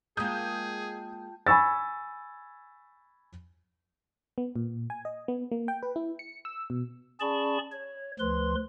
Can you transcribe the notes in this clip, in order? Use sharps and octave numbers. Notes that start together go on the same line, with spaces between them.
G#3 A#3 F4 G#4 G5 A5 D#6 G6
G#5 B5 C#6 E6 A6
B3
A#2
G#5
D#5
B3
A#3
G5
B4
E4
C#7
E6
B2
C#4 G#4 D5 A5 B5 C#6
C#5
D2 F3 B4 C6